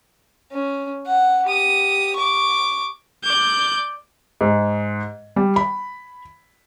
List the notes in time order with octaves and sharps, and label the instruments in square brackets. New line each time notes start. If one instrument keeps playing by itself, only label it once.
[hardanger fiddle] C#4
F#5
G4 D#6
C#6 D6
[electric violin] D5 G6
[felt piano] G#2
G3
B5